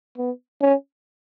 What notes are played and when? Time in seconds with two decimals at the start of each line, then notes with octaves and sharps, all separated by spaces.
0.18 B3
0.61 C#4